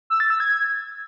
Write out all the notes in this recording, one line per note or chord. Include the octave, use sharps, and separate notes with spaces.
E6
A6
E6
G#6